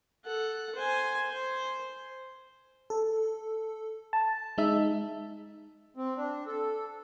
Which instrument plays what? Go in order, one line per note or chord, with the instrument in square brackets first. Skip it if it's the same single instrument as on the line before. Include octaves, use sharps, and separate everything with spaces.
[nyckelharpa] A4 F#5
C5 G#5
C5
[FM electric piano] A4
A5
G#3 D#4 E5
[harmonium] C4
D4
A4